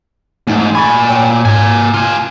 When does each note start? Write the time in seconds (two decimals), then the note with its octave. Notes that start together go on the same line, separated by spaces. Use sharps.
0.47 E2 G#2 A3 D#4
0.75 A#2 G#5 B5 C#6 A6
1.09 C#5 G5 A5
1.45 G#2 A#3 G#5
1.94 C3 F4 G#5